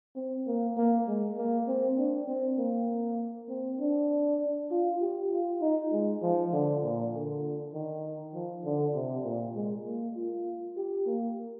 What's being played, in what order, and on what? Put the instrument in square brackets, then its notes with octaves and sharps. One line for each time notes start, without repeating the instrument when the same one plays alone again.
[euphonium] C4
A#3
A#3
G#3
A#3
C4
D4
C4
A#3
C4
D4
F4
G4
F4
D#4
G#3
F3
D3
A#2
D3
D#3
F3
D3
C3
A#2
G#3
A#3
F4
G4
A#3